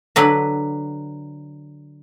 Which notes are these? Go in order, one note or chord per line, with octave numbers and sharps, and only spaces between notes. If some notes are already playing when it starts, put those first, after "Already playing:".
D3 F#3 B4